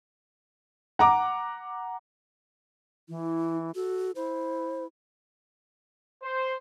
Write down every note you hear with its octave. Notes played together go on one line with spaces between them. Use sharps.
F#5 A#5 D6
E3 E4
F#4 A4
E4 C5
C5